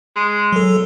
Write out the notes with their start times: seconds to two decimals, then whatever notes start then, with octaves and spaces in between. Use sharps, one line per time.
0.16 G#3
0.53 F#3 A4